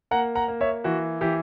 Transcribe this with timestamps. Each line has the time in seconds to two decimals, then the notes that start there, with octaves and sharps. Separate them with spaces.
0.11 A#3 F#5 A#5
0.35 F#5 A#5
0.48 A#3
0.61 C#5 E5
0.84 E3 F#4
1.21 E3 G4